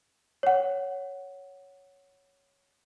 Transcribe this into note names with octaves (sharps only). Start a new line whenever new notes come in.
C#5 F#5